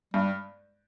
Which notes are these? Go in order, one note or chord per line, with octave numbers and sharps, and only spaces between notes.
G2 G3